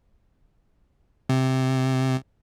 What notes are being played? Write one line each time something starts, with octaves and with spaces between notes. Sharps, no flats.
C3